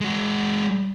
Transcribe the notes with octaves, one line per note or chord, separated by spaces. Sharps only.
G#3 F#4